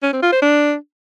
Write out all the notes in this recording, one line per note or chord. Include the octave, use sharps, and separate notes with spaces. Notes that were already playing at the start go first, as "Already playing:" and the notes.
C#4
C4
F4
C5
D4